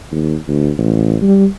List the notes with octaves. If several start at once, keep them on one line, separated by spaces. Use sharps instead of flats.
D#2
D2
A1
G3